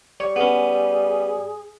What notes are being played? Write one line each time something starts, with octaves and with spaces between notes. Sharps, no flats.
G3 C#5
B3 C#4 G#4